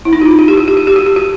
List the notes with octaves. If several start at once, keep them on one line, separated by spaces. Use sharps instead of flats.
E4
D#4
F#4
F4
F#4
G4
F#4
G4
F#4
G4
F#4
G4
F#4